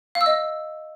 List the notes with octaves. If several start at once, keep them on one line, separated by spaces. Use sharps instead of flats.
F5
E6
D#5